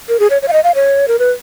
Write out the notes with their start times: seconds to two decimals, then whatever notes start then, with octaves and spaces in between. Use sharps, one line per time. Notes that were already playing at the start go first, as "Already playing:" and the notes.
0.09 A#4
0.20 G#4
0.30 C#5
0.42 C#5
0.48 F5
0.53 D#5
0.64 F5
0.75 C#5
1.08 A#4
1.19 B4